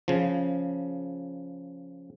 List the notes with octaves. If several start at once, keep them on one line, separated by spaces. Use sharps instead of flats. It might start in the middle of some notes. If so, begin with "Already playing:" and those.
C#3 F3